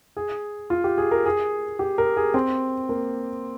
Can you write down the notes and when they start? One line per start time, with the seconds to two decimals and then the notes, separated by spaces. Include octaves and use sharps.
0.17 G#4
0.70 F4
0.84 G4
0.98 G#4
1.11 A#4
1.25 G#4
1.79 G4
1.98 A#4
2.17 G#4
2.34 C4
2.89 A#3